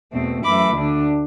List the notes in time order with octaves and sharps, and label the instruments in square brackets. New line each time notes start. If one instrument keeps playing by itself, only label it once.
[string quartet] E2 B2 A3 C4
F#2 E3 A3 E4 B5 D6
D2 D3 A3 D4